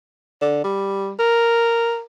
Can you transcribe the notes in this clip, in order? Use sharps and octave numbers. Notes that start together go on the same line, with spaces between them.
D3
G3
A#4